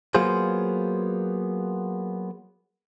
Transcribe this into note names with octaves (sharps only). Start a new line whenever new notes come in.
F#3 A#3 B3 F4 G#4 C5